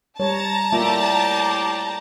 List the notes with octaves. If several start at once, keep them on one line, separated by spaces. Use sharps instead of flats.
G3 C#5 A5 A#5
A2 A#3 F4 G4 D5 E5